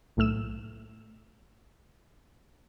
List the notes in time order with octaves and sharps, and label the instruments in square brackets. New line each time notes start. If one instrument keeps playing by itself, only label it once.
[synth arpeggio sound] B1 A2 A3 E6 E7